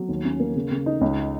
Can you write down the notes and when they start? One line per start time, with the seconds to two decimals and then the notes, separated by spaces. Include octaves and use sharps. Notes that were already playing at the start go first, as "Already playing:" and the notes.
Already playing: F#3
0.08 D#2
0.25 C#4
0.40 A#3
0.56 C#3
0.71 C#3
0.86 D#4
1.01 C#2